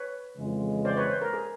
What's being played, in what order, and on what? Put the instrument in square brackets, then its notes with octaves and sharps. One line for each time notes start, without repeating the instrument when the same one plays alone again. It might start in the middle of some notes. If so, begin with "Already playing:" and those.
Already playing: [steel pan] B4 C#5
[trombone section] F2 C#3 E3 G#3
[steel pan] C5 D5
B4 C#5
C5
A#4
G#4